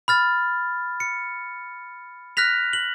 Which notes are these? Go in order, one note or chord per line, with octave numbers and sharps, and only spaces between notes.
B5 F6 A6
C#7
F6 F#6 A#6 B6 F7
F#7